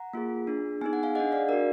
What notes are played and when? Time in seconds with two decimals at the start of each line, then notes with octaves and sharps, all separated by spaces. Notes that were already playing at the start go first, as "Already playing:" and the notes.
Already playing: F#5 A#5
0.13 A#3 F4 G#4
0.47 D4 G#4
0.81 B3 D#4 G#4 G#5
0.93 F#5
1.03 F5 G#5
1.15 D4 G#4 D#5 F#5
1.32 D5 F5
1.49 D4 F#4 A#4 D5